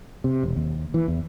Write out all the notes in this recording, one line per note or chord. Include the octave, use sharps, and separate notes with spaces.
C3
E1
D#2
E3
E2